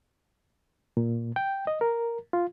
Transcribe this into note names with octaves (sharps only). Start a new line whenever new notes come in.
A#2
G5
D#5
A#4
F4